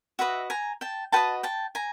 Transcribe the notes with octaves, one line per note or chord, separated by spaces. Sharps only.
F#4 B4 D#5 E5
G#5 A#5
G5 A5
F#4 B4 D#5 G5 A5
G5 A5
G#5 A#5